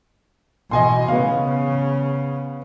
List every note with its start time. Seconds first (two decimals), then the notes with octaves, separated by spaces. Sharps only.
0.71 B2 E3 D#5 G#5 C6
1.08 C#3 B3 F5